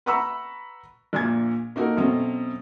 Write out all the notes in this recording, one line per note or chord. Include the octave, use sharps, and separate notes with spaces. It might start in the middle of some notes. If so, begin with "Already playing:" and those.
B4 F#5 A#5 B5 C#6 E6
A#1 A#2 G#5 G#6
A#3 D#4 F#4 A4 A#4
B2 F#3 A3 C4 C#4